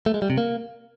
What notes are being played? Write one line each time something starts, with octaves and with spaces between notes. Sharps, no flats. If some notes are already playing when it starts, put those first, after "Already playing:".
A3
G#3
G3
C3
A#3